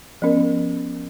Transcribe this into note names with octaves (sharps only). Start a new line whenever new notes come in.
F3 B3 C#4 A#4